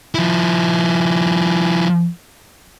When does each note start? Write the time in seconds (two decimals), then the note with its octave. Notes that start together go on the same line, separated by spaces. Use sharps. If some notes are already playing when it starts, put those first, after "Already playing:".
0.15 F3 E4